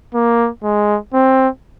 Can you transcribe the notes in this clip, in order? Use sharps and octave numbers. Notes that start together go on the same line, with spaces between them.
A#3
G#3
C4